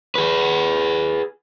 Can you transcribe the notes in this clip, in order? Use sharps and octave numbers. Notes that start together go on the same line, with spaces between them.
G#4 B4